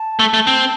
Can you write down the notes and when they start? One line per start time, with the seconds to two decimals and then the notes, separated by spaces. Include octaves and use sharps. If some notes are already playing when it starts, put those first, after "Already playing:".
Already playing: A5
0.19 A3
0.34 A3
0.47 C4